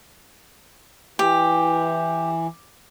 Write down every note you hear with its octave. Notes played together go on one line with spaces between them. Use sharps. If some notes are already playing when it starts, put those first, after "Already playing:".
E3 G4